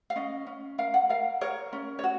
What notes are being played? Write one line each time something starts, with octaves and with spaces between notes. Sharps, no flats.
F5
C#4 D#5
C#4
A#4 F5
F#5
A#4 F5
A#4 C#5
C#4
C#5
F#4